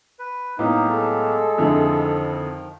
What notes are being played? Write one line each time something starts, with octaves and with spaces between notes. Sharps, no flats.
B4
A2 F#3 A#3 B3 D#4 G4 F5
G#3 A4
F2 D3 D#3 F3 E4